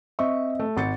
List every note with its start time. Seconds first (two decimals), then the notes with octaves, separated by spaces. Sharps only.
0.19 C4 D#5 E5 C#6
0.60 A3
0.76 G#1 A6 C#7